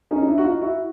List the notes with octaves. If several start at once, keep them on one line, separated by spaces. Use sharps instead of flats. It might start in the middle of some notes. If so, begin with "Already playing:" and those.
C#4 D#4
D#4
D4 E4
F#4
D#4 F4
E4 F#4